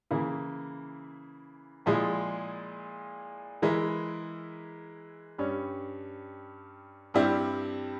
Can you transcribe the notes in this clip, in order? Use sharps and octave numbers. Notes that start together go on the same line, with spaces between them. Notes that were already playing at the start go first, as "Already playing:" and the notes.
C#3 E3 A#3 E4
A#2 F3 G#3 E4 G#4
E3 G#3 E4 A#4
G2 G3 C#4
G2 G3 C4 E4 G4